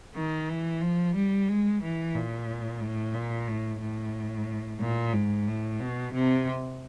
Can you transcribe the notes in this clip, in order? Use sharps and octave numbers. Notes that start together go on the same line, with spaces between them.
D#3
E3
F3
G3
G#3
E3
A#2
A2
A#2
A2
A2
A#2
G#2
A2
B2
C3